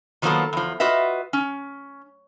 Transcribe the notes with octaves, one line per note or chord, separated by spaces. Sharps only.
D#3 F3 F#3 A#3 B3 A4
E2 F3
F4 F#4 B4 D#5 E5
C#4